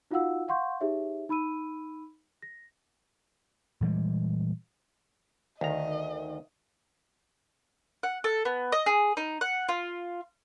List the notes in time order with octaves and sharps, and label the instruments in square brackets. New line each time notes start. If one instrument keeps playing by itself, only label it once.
[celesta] D#4 F4 F#4 F5 F#5 E6
F5 F#5 C6 C#6 G6
D#4 G4 G#4 C#5 E5
D#4 B5 E6 D#7
A#6
[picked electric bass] A#2 E3 G3 G#3
[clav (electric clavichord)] D2 A#5 [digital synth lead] D#3 [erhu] D#5
[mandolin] F#5
A4
B3
D#5
G#4
D#4
F#5
F4